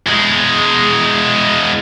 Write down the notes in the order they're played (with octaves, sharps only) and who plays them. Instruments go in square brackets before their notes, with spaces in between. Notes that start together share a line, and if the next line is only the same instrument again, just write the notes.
[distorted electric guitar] E2 G#3